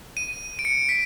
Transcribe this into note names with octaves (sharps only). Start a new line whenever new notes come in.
D#7
D7
C#7
B6